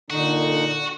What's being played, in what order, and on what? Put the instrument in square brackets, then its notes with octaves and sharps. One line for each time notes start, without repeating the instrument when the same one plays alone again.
[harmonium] A#2 D#4 [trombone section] D3 [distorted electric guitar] F#4